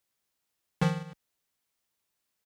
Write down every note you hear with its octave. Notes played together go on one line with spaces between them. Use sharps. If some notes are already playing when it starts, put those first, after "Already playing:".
D#3 F3